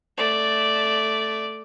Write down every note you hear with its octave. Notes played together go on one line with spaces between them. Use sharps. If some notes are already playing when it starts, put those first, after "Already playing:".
A3 D5